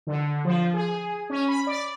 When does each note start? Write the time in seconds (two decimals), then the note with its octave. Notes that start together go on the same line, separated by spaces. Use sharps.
0.07 D3
0.44 F3
0.74 G#4
1.30 C#4
1.48 B5
1.67 D5